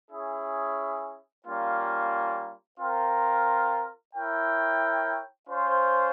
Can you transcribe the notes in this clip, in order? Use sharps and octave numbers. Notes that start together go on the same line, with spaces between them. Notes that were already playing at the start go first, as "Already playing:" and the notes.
C#4 E4 G#4
G3 A#3 C#4 F4
C4 F4 A#4
E4 A#4 C#5 G5
C#4 F4 C5